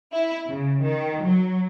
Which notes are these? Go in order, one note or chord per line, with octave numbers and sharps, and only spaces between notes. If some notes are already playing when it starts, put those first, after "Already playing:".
E4
C#3
D#3
F#3